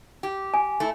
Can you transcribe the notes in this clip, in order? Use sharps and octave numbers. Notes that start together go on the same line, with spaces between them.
G4
G#5
A3 E4